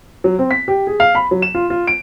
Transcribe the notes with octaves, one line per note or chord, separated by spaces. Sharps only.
F#3
C4
B6
G4
G#4
F5
B5
F#3
E7
F4
F4
D7